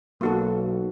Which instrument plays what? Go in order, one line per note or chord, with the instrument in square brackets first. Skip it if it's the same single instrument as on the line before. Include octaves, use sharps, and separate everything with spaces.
[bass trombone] B1 [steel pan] A#3 F#4 A4